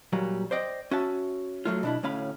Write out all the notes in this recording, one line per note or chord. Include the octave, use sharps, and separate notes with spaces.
A#2 F#3 G3 A#3
C5 D5 D#5 G5
C#4 F#4 E5 A5
F#3 A3 F4
B2 D4 E4
D2 A2 C#4 F5 B5